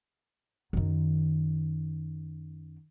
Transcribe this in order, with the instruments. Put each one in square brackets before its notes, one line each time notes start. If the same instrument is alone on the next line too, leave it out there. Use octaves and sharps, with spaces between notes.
[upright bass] F#2 D#3